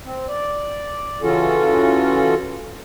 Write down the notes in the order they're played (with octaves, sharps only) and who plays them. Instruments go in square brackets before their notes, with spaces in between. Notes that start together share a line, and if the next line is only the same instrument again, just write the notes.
[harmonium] C4
D5
C#3 E3 C#4 F4 F#4 A4